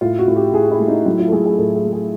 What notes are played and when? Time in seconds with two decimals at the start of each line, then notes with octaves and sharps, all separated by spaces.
0.01 A2 F4
0.18 F#4
0.28 A2
0.36 G4
0.54 A2 G#4
0.71 E4
0.80 A3
0.88 D#4
1.06 F#3 E4
1.19 F4
1.28 A4
1.32 A3 G#4
1.45 G#4
1.58 A2 A4
1.75 G#4
1.85 A3
1.93 G#4